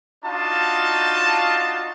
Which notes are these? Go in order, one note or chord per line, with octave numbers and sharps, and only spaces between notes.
D4 D#4 F4 F#4 F5 A5